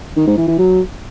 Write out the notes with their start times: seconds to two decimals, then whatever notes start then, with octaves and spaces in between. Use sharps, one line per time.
0.17 D#3
0.27 G#2
0.37 E3
0.48 E3
0.58 F#3